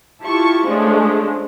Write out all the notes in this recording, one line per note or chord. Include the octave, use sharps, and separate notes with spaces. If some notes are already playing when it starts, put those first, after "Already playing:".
E4 F4 G4 A5 C#6
F3 G#3 A3 C#4 D4